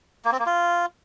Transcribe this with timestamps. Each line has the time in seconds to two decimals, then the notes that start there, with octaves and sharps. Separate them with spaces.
0.25 A#3
0.32 C4
0.39 A#3
0.46 F4